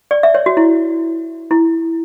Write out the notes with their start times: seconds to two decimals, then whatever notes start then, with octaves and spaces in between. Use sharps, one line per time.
0.11 D5
0.23 E5
0.34 C#5
0.46 F#4
0.57 E4
1.51 E4